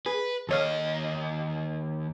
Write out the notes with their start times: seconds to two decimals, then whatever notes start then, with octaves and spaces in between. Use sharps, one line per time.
0.06 G#4 B4
0.49 D#2 A4 C#5 D#5 F5